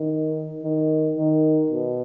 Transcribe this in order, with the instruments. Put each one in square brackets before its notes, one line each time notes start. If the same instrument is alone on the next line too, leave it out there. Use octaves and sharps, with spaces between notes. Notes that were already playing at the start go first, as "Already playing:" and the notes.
Already playing: [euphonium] D#3
D#3
D#3
B2